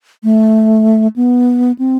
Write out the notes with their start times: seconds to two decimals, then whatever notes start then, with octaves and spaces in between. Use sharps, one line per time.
0.24 A3
1.16 B3
1.79 C4